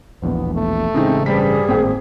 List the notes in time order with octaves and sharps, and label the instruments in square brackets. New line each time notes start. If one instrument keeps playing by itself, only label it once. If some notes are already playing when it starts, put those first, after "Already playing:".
[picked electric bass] E1 A#1 E2 [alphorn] B3
[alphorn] A3
[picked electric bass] A1 C#3 [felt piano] G#3 D#4 [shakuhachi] C4
[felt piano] G2 C5 B6 [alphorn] G3 [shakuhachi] G#4
[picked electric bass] G#1 A2 C4 [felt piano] A#3 C5 G5